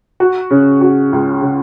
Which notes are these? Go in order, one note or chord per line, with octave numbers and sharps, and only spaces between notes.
F#4
C#3
F#4
C#2
C#3